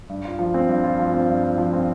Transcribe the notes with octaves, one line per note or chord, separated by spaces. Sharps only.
G2
F4
F3
C4
G2
F4
F3
C4
G2
F4
F3
C4